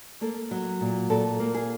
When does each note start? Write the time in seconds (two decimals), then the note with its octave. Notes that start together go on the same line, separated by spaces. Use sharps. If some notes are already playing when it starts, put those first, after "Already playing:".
0.21 A#3 A4
0.51 F#3
0.80 A#2
1.10 A#2 A4
1.40 A#3
1.54 G#4